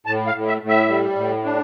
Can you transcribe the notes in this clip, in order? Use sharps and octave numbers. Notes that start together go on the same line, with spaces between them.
A2 A5
F5
A2
E5
A2
E5
G3
A2
D4